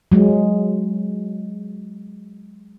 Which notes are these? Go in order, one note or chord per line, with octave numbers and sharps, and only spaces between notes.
F#3 G#3